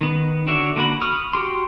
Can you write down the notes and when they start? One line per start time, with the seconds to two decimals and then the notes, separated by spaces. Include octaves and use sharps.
0.01 D#3 B3
0.47 D3 D4 F#4 C#5 E5
0.76 D3 A#3 F#4 B5
1.01 B5 C#6 D#6 F6
1.33 F#4 G4 C6